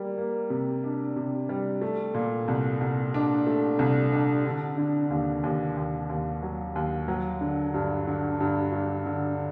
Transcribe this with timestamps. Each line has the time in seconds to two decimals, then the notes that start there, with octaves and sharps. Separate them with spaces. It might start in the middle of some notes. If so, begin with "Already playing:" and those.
Already playing: G3 A#3
0.18 A#3
0.50 C3
0.84 D4
1.16 C3
1.49 G3
1.82 A3
2.14 A#2
2.48 C2
2.81 C2
3.14 D4
3.47 A3
3.79 C2
4.12 D4
4.46 D3
4.78 D3
5.10 D#2
5.43 D#2
5.77 D#2
6.10 D#2
6.43 F#3
6.76 D#2
7.08 F#3
7.41 D3
7.74 G2
8.07 D3
8.40 G2
8.72 G2
9.06 D3